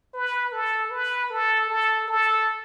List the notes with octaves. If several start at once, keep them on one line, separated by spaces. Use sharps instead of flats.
B4
A4
B4
A4
A4
A4